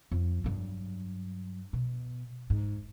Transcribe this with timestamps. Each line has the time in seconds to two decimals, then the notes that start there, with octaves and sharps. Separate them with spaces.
0.11 F2
0.44 G2 F#3
1.73 B2
2.50 G#2